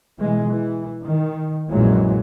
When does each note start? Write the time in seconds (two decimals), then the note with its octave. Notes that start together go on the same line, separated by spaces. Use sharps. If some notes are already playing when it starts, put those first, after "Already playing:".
0.19 B2 E3 G#3
0.47 E3
1.05 D#3
1.71 A#1 F#2 A#2 E3 F#3 G#3